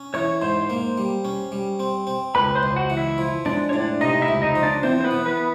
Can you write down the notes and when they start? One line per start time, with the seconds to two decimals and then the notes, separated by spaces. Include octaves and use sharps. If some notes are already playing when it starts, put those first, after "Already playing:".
Already playing: C#4
0.14 E3 C#5 C#6
0.41 G#2 C5 C6
0.70 A#3
0.97 G3
1.25 C#4
1.52 G3
1.80 C4
2.07 C4
2.35 C#2 B4 B5
2.55 C5 C6
2.63 C#2
2.76 F#4 F#5
2.90 E3
2.97 E4 E5
3.18 F3
3.45 G#3 D4 D5
3.69 C#5
3.73 A2 D4 D5
4.01 C3 D#4 D#5
4.22 E4 E5
4.28 C#2
4.42 D#4 D#5
4.56 F3
4.63 D4 D5
4.83 E3 C4 C5
5.00 C5
5.04 B3 B4
5.11 E3
5.25 B3 B4